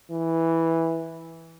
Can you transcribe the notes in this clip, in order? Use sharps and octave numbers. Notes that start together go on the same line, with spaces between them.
E3